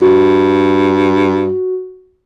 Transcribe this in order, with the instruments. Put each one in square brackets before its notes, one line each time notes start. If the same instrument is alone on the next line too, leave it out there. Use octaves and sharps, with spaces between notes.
[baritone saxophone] G2 [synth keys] F#4